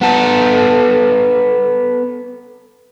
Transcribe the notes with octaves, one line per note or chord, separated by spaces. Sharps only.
B3 A4